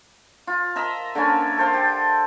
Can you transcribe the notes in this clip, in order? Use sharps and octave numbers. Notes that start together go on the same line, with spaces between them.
F4
A#4 D#5 E5 A#5
D3 A#3 C#4
A4 C5 F5
G4